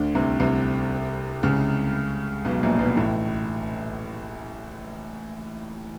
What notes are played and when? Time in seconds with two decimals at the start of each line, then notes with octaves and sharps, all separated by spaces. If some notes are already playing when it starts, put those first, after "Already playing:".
Already playing: D2 D3
0.15 C2 C3
0.40 C2 C3
1.43 C#2 C#3
2.45 B1 B2
2.63 A#1 A#2
2.79 B1 B2
2.96 A1 A2